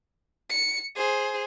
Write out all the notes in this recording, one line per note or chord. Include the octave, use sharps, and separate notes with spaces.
C#7
G#4 C5